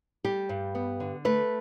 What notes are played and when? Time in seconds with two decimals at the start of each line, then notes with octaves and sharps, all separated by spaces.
0.24 G3 G4
0.49 G2
0.75 B3
1.00 D3
1.25 A3 B4